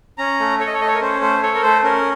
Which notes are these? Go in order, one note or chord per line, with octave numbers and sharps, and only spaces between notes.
C#4 A#5
A3
A4 C#5
D#5
C#5
A3 D#5
C#5
A#4
C#4 C5
A3 C5
A4 C#5
A#4
A3 C5
C#4 A#4